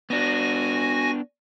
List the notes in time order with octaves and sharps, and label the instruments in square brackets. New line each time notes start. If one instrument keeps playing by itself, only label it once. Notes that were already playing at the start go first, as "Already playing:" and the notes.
[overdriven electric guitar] B3 D4 [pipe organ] F#4 G#5 A#6